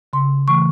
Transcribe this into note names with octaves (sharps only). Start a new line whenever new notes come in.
C#3 C6
E3 A3 C#6